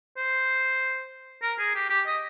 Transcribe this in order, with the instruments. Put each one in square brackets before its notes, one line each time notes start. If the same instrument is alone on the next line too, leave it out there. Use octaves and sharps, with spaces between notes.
[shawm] C5
A#4
G#4
G4
G4
D#5